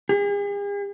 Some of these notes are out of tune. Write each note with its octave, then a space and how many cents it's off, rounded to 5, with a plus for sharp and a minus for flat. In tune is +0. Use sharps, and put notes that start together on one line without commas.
G#4 -45